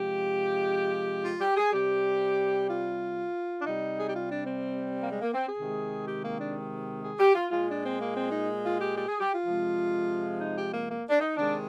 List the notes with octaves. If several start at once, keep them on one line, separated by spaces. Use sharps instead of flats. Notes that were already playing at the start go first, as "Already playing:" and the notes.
Already playing: C3 F3 G#3 G4
F4
G4
G#4
C3 G3 G4
F4
D4
C3 G3 D#4
G#4
G4
F4
D4
C4
A#3
G#3
A#3
C4
G#4
C3 D#3 G#3
G4
A#3
D4
G#4
G4
F4
A#2 G#3 F4
D4
C4
A#3
C4
D#4
F4
G4
G4
G#4
G4
F4
C3 F3 G#3
D#4
G4
A#3
A#3
D4
D#4
C3 D#3 G#3 D4